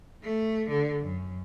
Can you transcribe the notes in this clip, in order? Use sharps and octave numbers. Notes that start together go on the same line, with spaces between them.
A3
D3
F#2